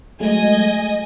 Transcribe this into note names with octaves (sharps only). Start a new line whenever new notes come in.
F#3 G#3 A3 D#5 G#5